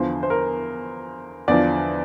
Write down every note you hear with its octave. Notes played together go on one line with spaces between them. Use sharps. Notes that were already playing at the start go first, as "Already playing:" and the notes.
Already playing: E2 D3 F3 C5
C5
A#4
E2 D3 F3 D5